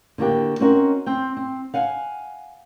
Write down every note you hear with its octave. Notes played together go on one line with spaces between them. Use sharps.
D3 A#3 F#4 G4
C4 C#4 D#4 F#4 A#4 C#5
C4 G5
C4
F5 F#5 G#5